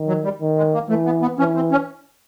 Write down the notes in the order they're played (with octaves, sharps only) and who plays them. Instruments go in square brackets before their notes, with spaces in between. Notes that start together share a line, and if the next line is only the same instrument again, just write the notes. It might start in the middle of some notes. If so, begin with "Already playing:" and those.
Already playing: [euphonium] D#3
[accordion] F#3
G3
[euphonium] D#3
[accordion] G#3
A#3
[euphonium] E3 [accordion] A3
[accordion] B3
B3
[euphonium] E3 [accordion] C#4
[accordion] C4
C#4